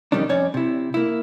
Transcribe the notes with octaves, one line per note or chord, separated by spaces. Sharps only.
F2 C3 D#3 G3 C#4 D4
F2 C#4 C#5 D5
C3 E4
A#3 E4